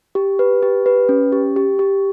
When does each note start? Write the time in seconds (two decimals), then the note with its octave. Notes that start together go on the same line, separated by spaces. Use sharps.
0.15 G4
0.39 B4
0.63 G4
0.86 B4
1.09 C#4
1.32 G4
1.56 G4
1.79 G4